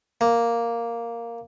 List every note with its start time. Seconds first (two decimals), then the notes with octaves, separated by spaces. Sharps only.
0.21 A#3